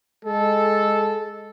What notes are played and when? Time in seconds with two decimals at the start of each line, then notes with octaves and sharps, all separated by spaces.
0.25 G#3 A4